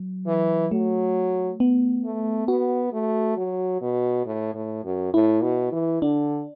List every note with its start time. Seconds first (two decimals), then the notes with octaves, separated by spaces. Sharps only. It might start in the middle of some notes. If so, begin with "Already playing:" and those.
Already playing: F#3
0.26 E3
0.71 F#3 A3
1.60 B3
2.04 A3
2.48 B3 F#4
2.93 A3
3.37 F#3
3.81 B2
4.26 A2
4.54 A2
4.84 F#2
5.13 A2 E4
5.43 B2
5.72 E3
6.02 D3 D4